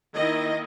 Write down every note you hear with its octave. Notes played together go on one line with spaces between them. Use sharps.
D#3 A#3 E4 D#5